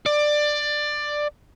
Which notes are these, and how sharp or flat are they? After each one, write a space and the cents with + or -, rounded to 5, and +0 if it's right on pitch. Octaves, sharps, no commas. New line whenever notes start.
D5 +15